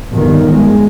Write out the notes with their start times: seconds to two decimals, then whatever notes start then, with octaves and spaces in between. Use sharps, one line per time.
0.12 G1 D#3
0.50 G#3